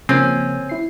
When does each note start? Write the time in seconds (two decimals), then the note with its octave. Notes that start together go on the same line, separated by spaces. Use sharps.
0.09 C#3 F3 A#3 C4 C#4
0.69 E4 C7